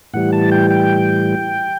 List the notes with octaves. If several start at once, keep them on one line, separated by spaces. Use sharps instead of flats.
A2 E3 G3 F#5
A5
G5
G5